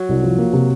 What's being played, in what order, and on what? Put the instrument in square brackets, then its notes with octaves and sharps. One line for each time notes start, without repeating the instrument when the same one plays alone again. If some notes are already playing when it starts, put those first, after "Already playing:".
Already playing: [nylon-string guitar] F#3
[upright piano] C2
F3
A#3
C3